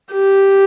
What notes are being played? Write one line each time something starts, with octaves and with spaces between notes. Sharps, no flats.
G4